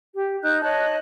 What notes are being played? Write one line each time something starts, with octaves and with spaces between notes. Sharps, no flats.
G4
D#4 F#6 G6
C#5 D#5 A5 F#6